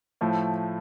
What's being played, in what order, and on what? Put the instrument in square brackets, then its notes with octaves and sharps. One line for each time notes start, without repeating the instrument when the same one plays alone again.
[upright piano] A2 F3 A3